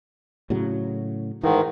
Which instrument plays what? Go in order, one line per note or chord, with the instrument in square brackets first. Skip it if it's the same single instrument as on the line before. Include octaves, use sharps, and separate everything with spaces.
[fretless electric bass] A2 C#3 F#3
[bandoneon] G#2 D#3 [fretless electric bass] E3